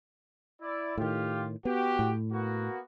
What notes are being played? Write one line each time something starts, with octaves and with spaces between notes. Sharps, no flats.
E4 D5
A2 D#3 F4 G4
B3 F#4 G4
A2
A#3 B3 F#4